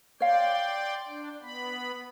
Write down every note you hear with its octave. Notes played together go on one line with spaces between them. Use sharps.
C#5 D5 F5 G5 C6
D4
B3 B5